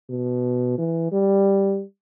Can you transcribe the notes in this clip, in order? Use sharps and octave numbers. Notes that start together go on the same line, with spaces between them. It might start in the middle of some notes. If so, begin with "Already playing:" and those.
B2
E3
G3